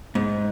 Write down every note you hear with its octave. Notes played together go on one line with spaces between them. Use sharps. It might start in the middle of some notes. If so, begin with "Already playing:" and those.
G#2